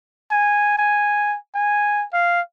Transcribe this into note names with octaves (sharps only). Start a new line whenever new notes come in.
G#5
G#5
G#5
F5